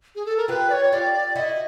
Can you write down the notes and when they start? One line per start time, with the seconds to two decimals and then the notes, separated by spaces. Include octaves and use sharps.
0.16 G#4
0.26 A4
0.37 A#4
0.48 F4 G4 B4
0.70 D5
0.73 C#5
0.92 F4 G4 D5
1.14 D5
1.35 E4 F#4 D#5